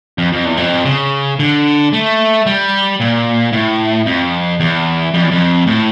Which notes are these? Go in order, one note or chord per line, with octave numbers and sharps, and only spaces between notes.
F2
F2
E2
F2
C#3
D3
A3
G3
A#2
A2
F2
E2
F2
E2
F2
A2